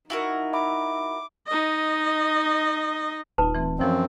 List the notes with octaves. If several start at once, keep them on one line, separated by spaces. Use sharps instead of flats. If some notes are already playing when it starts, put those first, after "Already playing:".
D#4 E4 F#4 A#4
E5 B5 D6
D#4 D#5
D#1 D#4 F4 B4 A5
E3 A3 C4
F#2 E3 F3 C4 C#5